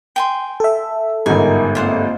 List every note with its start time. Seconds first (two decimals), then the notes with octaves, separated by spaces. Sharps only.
0.16 G5 G#5 C6
0.60 A4 E5
1.26 G1 G#2 A#4 F#5 G#5 A#5
1.75 A#3 C4 F4 C5 F#5